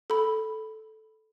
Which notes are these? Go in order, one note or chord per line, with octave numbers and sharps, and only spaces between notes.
A4 B5